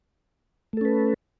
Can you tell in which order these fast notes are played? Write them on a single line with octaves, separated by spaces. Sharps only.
A3 A4 C#4 B4